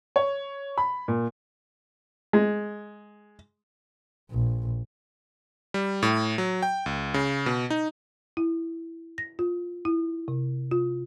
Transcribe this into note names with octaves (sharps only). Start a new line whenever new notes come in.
C#5
B5
A#2
G#3
A#1
G3
A2
F#3
G5
C#2
C#3
B2
D#4
E4
A#6
F4
E4
C3
F4